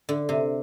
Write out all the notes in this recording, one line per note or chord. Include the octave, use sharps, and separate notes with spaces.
D3
C3